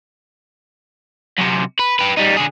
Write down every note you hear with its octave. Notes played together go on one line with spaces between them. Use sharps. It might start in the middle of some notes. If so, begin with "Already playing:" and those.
F#2 C3
B4
G4 B4
G3 D#4
D3 G#4